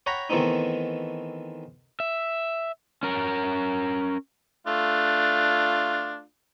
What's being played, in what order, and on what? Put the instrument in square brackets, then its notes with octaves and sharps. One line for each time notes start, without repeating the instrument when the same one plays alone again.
[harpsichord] C#5 F#5 G5 A#5 B5
D#3 E3 A3 B3 C4 D#4
[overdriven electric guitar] E5
C#4 A#4
[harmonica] A3 D4 F4